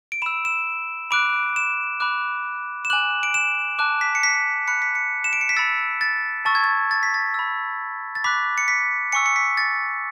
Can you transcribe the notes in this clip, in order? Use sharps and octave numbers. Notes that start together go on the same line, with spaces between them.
D7
B5 E6 E7
E7
B5 D6 F#6 D7
E7
B5 D6 F#6
E7
G#5 D6 F#6 F#7
D7
E7
A5 D6 F#6
B6
C#7
B6
B5 F#6 C#7
B6
C#7
E7
D7
C#7
B6
B5 E6 A6
A6
A5 C#6 E6 A6
G#6
A6
A6
B6
A6
B5 E6
A6
B5 D6 F#6 B6
C#7
B6
G#5 C#6 E6 C#7
C#7
B6
A6